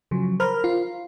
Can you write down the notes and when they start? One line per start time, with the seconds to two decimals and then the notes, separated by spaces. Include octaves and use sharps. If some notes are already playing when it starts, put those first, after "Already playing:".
0.11 C#3 F3 F#3
0.40 A#4 C5 A#5 B5 F6
0.64 F4